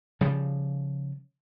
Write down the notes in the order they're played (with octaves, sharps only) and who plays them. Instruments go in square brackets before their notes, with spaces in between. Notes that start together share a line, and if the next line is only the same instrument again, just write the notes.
[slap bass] C#3 F3 G3